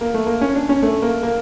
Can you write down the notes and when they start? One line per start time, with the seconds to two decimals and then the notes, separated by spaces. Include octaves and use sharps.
0.01 A#3
0.14 A3
0.26 A#3
0.41 C#4
0.56 D4
0.69 C#4
0.82 A3
1.02 A#3
1.23 A#3